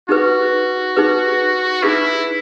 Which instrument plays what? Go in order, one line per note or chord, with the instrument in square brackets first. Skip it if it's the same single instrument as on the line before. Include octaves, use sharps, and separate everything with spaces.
[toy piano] D#4 G#4 B4 [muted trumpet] F#4
[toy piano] D#4 G#4 B4
[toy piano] D#4 G#4 B4 [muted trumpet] E4